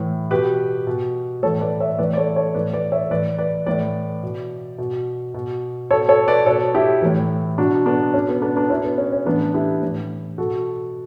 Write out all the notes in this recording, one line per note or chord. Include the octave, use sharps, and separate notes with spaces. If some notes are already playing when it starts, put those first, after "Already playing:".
Already playing: A2 E3
B2 G4 B4
B2
A2 E3 A4 C#5
B4 D5
C#5 E5
A2 E3 B4 D5
D5
A4 C#5
A4 C#5
A2 E3 B4 D5
B4 D5
C#5 E5
A2 E3 B4 D5
B4 D5
A2 E3 B4 D5
B2
B2
B2
B2 A4 C#5
A4 C#5
B4 D5
B2 A4 C#5
E4 G4
A2 E3
B2 D4 F#4
B3 D4
B2 C#4
B3
B3 D4
B3 D4
B2 C#4 E4
B3
C#4
C#4
A2 E3 B3 D4
E4 G4
A2 E3
B2 F#4 A4